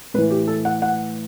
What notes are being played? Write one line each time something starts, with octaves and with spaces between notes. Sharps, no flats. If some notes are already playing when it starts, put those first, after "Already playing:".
A2 E3 B4
G4
A4
F#5
F#5